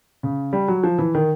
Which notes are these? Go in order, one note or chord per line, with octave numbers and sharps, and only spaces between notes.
C#3
G3
F#3
F3
E3
D#3